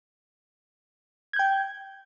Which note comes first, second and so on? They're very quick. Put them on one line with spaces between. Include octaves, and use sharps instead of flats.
G#6 G6 G5